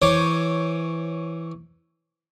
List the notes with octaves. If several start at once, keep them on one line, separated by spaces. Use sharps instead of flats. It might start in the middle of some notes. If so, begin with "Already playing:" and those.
E3 C5 C#5 D6